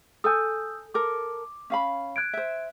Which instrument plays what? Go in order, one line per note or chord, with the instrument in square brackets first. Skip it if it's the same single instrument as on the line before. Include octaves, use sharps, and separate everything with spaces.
[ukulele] A4 G#5 [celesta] D#6 E6 G6
[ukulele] A4 A#4 [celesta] D6
[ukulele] C#4 F5 B5
[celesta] F#6 G#6 D7
[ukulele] C5 E5